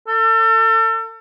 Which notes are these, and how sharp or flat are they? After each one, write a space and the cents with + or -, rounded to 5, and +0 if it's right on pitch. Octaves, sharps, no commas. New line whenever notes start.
A4 +35